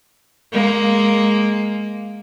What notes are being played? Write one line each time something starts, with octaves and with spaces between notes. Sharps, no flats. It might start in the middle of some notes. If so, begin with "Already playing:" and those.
G#3 A#3